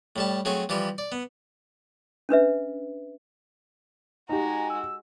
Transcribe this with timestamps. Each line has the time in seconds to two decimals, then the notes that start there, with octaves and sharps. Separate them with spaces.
0.16 A2 G3 A5
0.45 F#3 A3 C4 G#4
0.69 E3 F3 G3 G4
0.98 D5
1.12 B3
2.29 C#4 D4 B4 E5
4.29 G#3 D#4 F#4 G4 G#5 A#5
4.70 E6